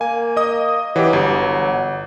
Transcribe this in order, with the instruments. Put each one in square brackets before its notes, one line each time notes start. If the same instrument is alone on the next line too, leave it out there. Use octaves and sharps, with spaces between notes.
[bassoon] A#3 [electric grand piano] G#5
[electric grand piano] D#5 D#6
[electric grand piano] E3 G4 [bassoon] F#3
[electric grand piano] G1